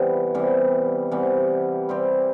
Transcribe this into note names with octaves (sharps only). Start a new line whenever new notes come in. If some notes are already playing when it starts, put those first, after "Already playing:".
Already playing: C3 E3 G3 B3
C3 E3 G3 B3
C3 E3 G3 B3
G3 C4 G4